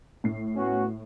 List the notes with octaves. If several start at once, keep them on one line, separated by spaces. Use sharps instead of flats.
A2 C7
B3 C#4 F#4